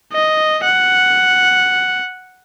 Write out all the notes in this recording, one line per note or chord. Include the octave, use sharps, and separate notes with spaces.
D#5
F#5